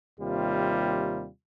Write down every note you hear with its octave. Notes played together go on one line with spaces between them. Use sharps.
D#2 C3 G3 F4